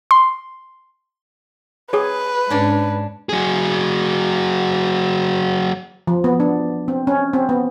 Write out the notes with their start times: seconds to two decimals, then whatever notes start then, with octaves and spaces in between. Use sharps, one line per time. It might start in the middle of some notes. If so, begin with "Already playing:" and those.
0.11 C6
1.93 G#4 B4 C#5
2.50 G#2 C#4 D4
3.29 F#3 G#4
6.07 F3
6.24 B3
6.40 D4
6.88 C4
7.07 C#4
7.33 C4
7.49 B3